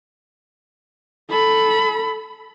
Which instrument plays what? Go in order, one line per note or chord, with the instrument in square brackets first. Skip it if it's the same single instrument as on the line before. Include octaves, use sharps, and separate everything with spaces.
[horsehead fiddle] A4 B5